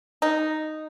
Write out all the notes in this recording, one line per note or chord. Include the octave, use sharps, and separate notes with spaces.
D#4